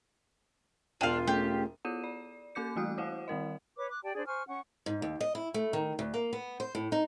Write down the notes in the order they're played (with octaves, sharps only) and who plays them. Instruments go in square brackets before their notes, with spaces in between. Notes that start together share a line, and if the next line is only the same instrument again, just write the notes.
[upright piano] E1 G5 D#7 [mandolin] D4 F5 [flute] F4
[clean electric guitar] A3 C#4 G#4 [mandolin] G4
[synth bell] B3 E4 F4 A4 D#7 E7
D5
A#3 C#4 A4 D6 G6 C#7
E3 G3 A3 F#4 D#6 F#6
E4 F#4 C5 F5 F#5
D#3 G3 A#4 D#5
[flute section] B4 C#5 D6
D6 F#6
G4 D5 G5 A5
D4 G#4 C5 D5
C5 G#5 C#6 F6
C#4 F#5 C#6
[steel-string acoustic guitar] G#2
D#2
D#5
E4
A3
D#3
D2
A#3
B3
C5
A2
D#4